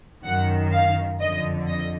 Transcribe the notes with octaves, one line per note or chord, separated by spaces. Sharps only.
F#2 D#3 F#5
F5
F2 D3 D#5
D#5